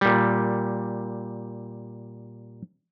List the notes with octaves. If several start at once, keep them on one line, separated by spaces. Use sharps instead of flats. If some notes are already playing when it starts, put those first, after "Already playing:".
A#2 G3